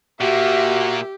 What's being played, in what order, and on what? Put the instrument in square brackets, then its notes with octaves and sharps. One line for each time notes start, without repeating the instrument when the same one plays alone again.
[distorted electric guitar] A#2 A#3 [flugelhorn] F#4 [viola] G4 [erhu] E5